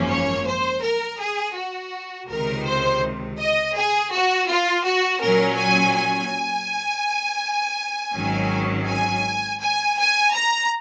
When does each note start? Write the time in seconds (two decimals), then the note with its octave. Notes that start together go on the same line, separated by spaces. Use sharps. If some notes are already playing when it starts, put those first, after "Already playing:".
Already playing: G#1 F#2 F3 A#3 C#4
0.09 C#5
0.46 C5
0.82 A#4
1.19 G#4
1.56 F#4
2.29 C#2 C3 D#3 A#4
2.65 C5
3.39 D#5
3.75 G#4
4.12 F#4
4.49 F4
4.85 F#4
5.22 A#2 F#3 C#4 A#4
5.58 G#5
5.95 G#5
8.14 G#1 G#2 D#3 F#3 C#4
8.87 G#5
9.61 G#5
9.98 G#5
10.34 A#5